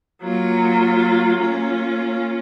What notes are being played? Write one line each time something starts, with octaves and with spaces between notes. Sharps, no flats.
F#3 A#3 F4
A#3 C#4 F4